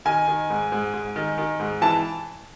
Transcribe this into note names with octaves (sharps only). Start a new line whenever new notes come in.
D#3 G#5
D#3
G#2
G#2
G#2
D#3
D#3
G#2
E3 A5